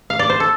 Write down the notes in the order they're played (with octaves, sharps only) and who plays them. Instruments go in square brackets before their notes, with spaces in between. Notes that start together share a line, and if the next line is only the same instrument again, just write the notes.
[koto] F5
D5
C5
A4